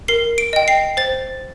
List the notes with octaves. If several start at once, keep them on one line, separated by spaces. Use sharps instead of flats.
A#4 C7
D7
D#5 G5
C7
C5 A6